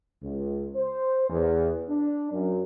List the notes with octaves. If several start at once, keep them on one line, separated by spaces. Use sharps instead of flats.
C#2
C5
E2
D4
F#2